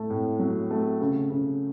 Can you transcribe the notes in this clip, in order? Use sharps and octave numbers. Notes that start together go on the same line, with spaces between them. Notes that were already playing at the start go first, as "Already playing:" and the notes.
Already playing: A2 A3
A2
F#3
A3
C#3
C#3